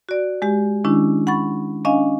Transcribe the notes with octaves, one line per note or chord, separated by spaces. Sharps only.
F#4 D5
G#3 G4
D#3 G#3 C#4 D4 E4
F#5 B5 C#6 A6
C#4 D4 D#5 F5 G#5